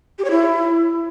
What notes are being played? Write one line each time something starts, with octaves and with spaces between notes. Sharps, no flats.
G4
C#5
E4